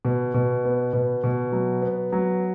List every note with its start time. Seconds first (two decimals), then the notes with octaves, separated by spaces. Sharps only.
0.05 B2
0.34 B2
0.65 B3
0.93 B2
1.24 B2
1.52 F#3
1.82 B3
2.12 F#3